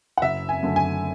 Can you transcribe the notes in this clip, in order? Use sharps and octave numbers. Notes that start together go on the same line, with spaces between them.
F#5
F#1 E5
G#5
F#2 D3 A3
G#5